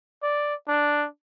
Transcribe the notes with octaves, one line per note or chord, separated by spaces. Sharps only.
D5
D4